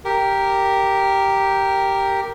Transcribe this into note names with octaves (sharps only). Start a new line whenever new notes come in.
G4 A#4